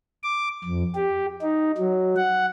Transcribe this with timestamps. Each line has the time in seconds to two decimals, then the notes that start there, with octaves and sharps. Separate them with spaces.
0.23 D6
0.64 F2
0.95 G4
1.42 D#4
1.78 F#3
2.16 F#5